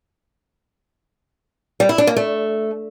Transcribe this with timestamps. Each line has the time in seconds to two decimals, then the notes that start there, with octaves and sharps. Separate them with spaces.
1.80 G3
1.89 E4
1.98 D4
2.07 A#3
2.17 A3